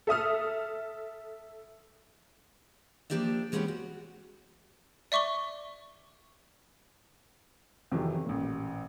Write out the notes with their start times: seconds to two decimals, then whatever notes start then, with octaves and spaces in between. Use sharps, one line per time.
0.07 A4 E5 D#6 F6
3.10 F3 A#3 D4 G4 D5 E5
3.52 E3 G#3 A#3 B3 C#4 G4
3.68 F#4
5.12 D5 E5 C#6 D6 G7
7.91 F2 C3 D#3 E3 F#3
8.26 A1 A#2